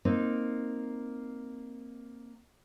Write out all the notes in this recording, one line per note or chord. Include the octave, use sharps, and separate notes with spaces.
A#3 C4 D#4